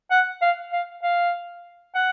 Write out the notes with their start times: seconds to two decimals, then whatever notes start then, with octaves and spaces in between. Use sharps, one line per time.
0.11 F#5
0.42 F5
0.72 F5
1.03 F5
1.95 F#5